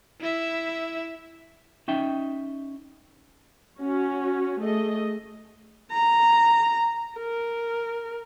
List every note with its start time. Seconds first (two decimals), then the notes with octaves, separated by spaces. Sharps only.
0.20 E4 E5
1.88 C#4 D#4 E5 G5
3.79 C#4 F#4
4.61 A3 G#4 D#5
5.92 A#5
7.18 A#4